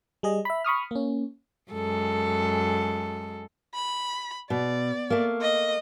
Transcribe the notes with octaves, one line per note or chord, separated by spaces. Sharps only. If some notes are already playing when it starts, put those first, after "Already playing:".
G3 G#4 D#5
E5 B5
B5 C#6 D#6 F6
A#3 C#4
F#2 G#3 A4
B5
B2 D5
A3 A#3
D#5